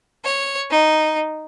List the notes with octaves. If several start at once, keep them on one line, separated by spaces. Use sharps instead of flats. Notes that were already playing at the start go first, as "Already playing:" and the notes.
C#5
D#4